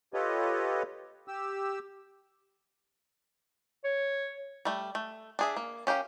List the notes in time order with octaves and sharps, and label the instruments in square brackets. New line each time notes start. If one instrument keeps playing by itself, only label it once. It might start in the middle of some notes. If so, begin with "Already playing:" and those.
[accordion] F4 G4 A4 B4 C#5 D#5
G4 E6
[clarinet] C#5
[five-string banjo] G3 A3
A3
D4 G#4 E5
A#3
C#4 G4 A#4 F5